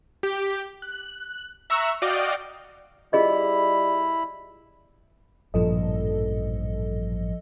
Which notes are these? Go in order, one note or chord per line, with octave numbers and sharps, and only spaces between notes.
G4
F#6
E5 A#5 C#6 E6 F#6
F#4 D5 D#5 F5 G5
G3 E4 F4 G#4 D#5 B5
A1 G2 A#2 F3 A4 D#5